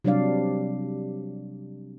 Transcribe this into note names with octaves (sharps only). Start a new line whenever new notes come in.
C3 F#3 G3 D4 D5 F5